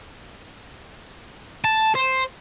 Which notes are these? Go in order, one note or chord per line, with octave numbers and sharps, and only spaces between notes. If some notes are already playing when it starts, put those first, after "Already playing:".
A5
C5